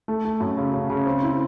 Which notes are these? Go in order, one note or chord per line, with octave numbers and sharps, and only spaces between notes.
A3
A3
F#2
C#3
C#3
C#3
C4
E4